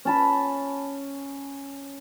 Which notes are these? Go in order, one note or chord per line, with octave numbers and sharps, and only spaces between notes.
C#4 A5 B5